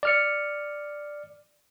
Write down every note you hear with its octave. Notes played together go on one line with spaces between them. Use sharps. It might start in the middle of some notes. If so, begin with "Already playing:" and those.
D5 F6 C#7